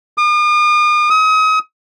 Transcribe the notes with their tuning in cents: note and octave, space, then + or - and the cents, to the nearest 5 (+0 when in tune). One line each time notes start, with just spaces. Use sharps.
D#6 -45
D#6 +35